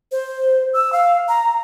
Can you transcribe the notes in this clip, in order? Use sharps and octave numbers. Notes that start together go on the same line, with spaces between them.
C5
E6
F5
A#5